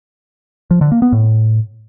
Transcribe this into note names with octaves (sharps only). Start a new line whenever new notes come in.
F3
D3
A#3
B3
A2